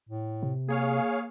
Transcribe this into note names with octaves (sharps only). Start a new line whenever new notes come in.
A2
C3
A#3 G#4 C#5 F5